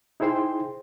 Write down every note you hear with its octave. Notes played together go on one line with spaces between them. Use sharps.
D#4 E4 G#4 C5 G5 C6